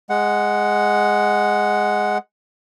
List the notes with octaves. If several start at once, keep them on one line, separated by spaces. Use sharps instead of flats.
G#3 F#5